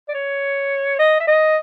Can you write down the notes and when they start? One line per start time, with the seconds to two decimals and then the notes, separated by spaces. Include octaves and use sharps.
0.09 D5
0.14 C#5
0.99 D#5
1.20 E5
1.27 D#5